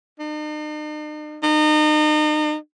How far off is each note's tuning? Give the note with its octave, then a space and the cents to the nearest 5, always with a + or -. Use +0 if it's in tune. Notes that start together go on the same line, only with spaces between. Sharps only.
D#4 -45
D#4 -35